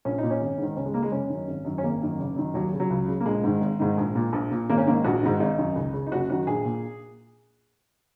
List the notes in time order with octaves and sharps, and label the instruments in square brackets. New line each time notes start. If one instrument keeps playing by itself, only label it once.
[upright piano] A#1 C#4
A#2 D#4
C#4
G#1
G#2 D#3
C#2 C#4
G#3
C#3 A#3
G#3
F#1 C#4
F#2 D#3
G#1
F#2 D#3
C#4
G#1 A#3
F#2 D#3
F#1
F#2 D#3
D#2 F#3
C#3
F#3
C#2
C#3
A#3
A#1 G#3
G#2 D#3
G#1
G#2 D#3
A#1
A#2
A#1
A#2
G#1 A#3
C#4
G#2 D#3 A#3
A#1 F#4
G#2 D#3
G#1 D#4
F#2 D#3
C#2
C#3
D#4
F#1 F#4
F#2 D#3 F#4
A#1 G#4
A#2